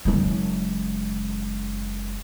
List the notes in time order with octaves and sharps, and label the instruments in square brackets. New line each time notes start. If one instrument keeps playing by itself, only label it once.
[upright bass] F#1 G#3